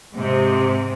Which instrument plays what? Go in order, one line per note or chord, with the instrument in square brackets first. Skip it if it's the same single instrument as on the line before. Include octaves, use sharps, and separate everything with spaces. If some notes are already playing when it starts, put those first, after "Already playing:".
[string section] G#2 C3